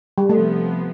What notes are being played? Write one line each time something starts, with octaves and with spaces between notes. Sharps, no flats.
G3
C3 F3 A3 B3